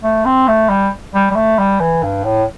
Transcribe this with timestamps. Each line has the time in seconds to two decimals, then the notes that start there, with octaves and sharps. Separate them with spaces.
0.03 A3
0.26 C4
0.48 A3
0.69 G3
1.15 G3
1.31 G3
1.36 A3
1.59 G3
1.80 E3
2.03 G2
2.24 A2